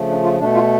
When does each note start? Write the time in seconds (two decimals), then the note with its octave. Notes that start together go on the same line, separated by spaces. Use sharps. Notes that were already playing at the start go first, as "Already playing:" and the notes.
Already playing: C#3 F3 A3
0.09 D4
0.24 F4
0.39 B2 A3 D4
0.55 F4